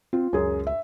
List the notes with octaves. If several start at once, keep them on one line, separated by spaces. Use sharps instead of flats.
C4 F4
C#2 F#2 G#4
E5